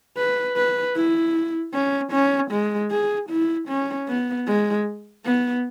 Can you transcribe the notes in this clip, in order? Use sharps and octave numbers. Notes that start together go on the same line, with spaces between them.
B4
B4
E4
C#4
C#4
G#3
G#4
E4
C#4
B3
G#3
B3